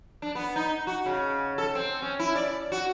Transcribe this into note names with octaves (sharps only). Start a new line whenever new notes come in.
D4
B3
D#4
F#4
C#3
A4
C4
C#4
E4
D5
F#4